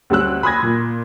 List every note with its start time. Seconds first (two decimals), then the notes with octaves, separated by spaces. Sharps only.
0.10 D2 G3 C#4 F#4 E6 F#6
0.43 B5 C6 D#6 F#6 G#6 A#6
0.63 A#2